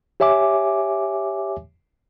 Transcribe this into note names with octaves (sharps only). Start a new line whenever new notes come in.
G4 C#5 E5 G#5 D6